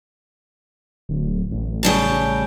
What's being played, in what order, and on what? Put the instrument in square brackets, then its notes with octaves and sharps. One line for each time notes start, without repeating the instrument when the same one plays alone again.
[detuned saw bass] D1
A1
[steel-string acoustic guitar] C#3 G3 A5